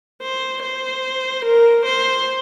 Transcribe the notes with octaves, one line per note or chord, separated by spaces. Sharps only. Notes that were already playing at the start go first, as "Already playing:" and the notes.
C5
C5
A#4
C5